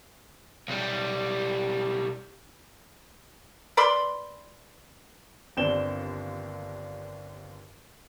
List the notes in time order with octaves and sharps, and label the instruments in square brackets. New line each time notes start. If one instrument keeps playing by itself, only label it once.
[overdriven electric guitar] B1 G3
[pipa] B4 D5 B5 C6
[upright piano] G1 D#2 C4 D4 E7 G7